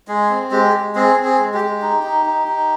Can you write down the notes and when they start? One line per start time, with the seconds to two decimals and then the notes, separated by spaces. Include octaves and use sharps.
0.08 G#3 G#4
0.29 C4
0.51 G#3 G4
0.73 G#3
0.95 C4 G#4
1.16 C4
1.24 G#4
1.38 G#3
1.54 G4
1.61 G#3
1.82 D#4
2.03 D#4
2.26 D#4
2.48 D#4